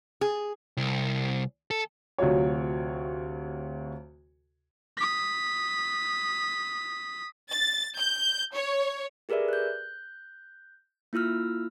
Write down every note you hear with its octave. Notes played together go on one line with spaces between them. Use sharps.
G#4
C2
A4
D2 C3 F#3 F4 C#5
D#6 B6
A6
G6
C#5
G4 G#4 A#4 B4 D5 E5
F#6 G6
A#3 E4 F4 E6 F6